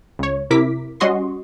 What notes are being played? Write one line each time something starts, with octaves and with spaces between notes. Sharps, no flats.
C#2 C#5
C3 E4 A#4 D6 B6
G3 C#4 F#4 D#5 C6 C#6